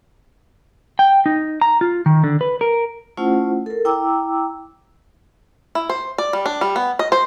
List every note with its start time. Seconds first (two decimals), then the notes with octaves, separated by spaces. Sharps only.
0.99 G5
1.26 D#4
1.62 A#5
1.81 F4
2.06 D#3
2.24 D3
2.41 B4
2.61 A#4
3.17 A3 C#4 E4 F4 C5 F#5
3.66 A4 A#4
3.85 E4 G5 A#5 D6 E6
5.75 E4
5.89 C5
6.18 D5
6.33 G3
6.46 D4
6.61 G3
6.76 B3
6.99 D#5
7.12 C5